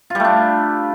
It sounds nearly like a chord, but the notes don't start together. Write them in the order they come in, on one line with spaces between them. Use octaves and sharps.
F4 G3 A3 D4